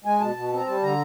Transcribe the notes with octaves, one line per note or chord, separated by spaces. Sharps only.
G#3 G#5
B2 A5
B2
C4
A#5
G3 A5
D3 A#5